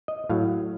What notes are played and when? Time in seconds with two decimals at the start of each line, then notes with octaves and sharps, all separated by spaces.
0.08 D#5
0.29 A2 F#3 F5